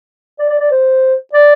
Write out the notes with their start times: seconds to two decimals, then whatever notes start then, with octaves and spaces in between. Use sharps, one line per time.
0.39 D5
0.49 D5
0.60 D5
0.71 C5
1.33 D5